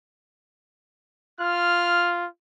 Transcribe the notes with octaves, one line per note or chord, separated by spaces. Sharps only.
F4 F6